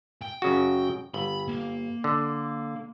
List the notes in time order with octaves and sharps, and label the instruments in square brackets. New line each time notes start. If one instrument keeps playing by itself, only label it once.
[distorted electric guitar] G5
[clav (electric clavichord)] F#2 C#3 F#4
[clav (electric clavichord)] G1 [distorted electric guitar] B5
[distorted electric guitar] A#3
[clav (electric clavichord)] D3